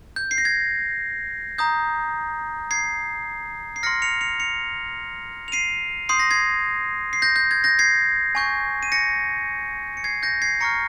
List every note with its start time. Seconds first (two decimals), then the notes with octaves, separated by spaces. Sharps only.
0.16 G6
0.31 C7
0.38 A#6
0.45 G#6
1.58 A#5 D#6 G6
2.71 G#6 C7
3.76 C7
3.83 C6 F6 A#6 C#7
4.02 C#7 F7
4.21 C#7 F7
4.40 C#7 F7
5.48 F7
5.52 C7 D#7
6.09 C6 D#6 G6 C7
6.19 A#6
6.31 G#6 C7
7.13 C7
7.22 G6 A#6
7.36 G6
7.51 G#6
7.64 G6 A#6
7.79 G#6 C7
8.35 G#5 C#6 G6
8.83 D#7
8.92 A#6 C#7
9.97 C#7
10.04 G#6 C7
10.23 G6 A#6
10.42 G#6 C7
10.61 A#5 C#6 F6 A#6 C#7